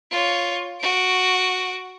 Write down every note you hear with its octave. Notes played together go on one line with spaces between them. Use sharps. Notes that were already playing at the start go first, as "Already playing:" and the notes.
F4 C#5
F#4 D7